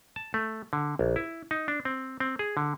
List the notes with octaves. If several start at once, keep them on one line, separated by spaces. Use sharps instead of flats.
A5
A3
D3
A#1
E4
D#4
D4
C4
C4
G#4
D3